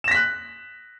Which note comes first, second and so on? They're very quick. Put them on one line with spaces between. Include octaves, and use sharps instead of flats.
E7 A#6 B6 F#6